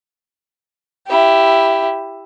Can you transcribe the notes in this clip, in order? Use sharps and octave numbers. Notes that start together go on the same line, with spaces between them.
E4 G4